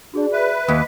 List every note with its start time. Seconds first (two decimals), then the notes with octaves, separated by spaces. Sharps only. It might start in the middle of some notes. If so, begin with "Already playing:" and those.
0.14 D4 F#4 G#4 D5
0.32 B4 E5
0.68 D#2 D#5 B6